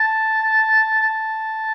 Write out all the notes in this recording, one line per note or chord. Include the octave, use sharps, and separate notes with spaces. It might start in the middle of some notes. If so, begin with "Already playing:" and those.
Already playing: A5
A5